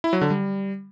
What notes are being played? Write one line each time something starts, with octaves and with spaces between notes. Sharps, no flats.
E4
F#3
D3
G3